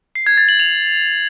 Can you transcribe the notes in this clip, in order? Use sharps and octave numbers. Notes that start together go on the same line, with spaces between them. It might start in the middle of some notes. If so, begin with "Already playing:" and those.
C7
G#6
A6
F#7
F7